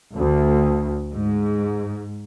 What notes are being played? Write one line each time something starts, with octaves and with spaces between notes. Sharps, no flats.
D2
G#2